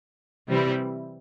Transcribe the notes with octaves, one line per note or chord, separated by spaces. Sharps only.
C3 E3 G3 C4 E4